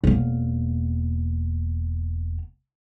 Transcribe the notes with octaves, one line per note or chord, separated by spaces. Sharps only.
E1 A#3